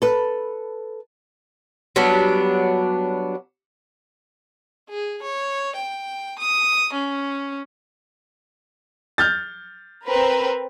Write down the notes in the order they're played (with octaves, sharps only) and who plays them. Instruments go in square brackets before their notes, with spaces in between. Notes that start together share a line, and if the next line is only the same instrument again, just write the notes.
[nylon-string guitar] A4 B4
[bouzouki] F#3 G3 B3 D4
[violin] G#4
C#5
G5
D#6
C#4
[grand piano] F6 G6 A6
[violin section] C4 A#4 B4